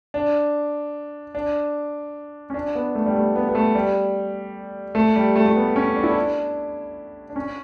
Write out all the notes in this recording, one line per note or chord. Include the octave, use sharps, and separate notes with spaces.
D4
D4
C#4
D4
B3
A3
G3
A3
B3
B3
A3
G3
A3
G3
A3
A3
B3
C#4
D4
E4
D4
D4
C#4